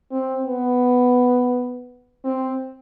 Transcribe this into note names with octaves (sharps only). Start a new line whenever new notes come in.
C4
B3
C4